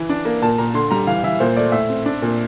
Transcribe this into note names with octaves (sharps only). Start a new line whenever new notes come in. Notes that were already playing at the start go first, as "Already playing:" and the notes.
Already playing: E3
D4
A#3
A#2 A5
A#2 A#5
D3 C6
G3 A#5
E3 F5
E3 E5
A#2 C5
A3 D5
A2 E5
C4
D4
A#2